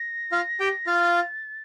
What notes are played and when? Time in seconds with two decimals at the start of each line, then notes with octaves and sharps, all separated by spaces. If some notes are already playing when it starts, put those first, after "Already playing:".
Already playing: A#6
0.32 F4 F5
0.60 G4 G5
0.87 F4 F5 A6